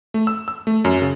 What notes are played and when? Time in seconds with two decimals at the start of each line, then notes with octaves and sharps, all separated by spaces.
0.14 A3
0.27 E6
0.48 E6
0.67 A3
0.85 F#2
1.02 C#3